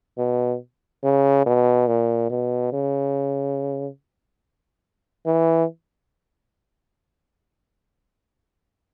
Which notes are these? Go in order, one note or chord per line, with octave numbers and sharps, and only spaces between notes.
B2
C#3
B2
A#2
B2
C#3
E3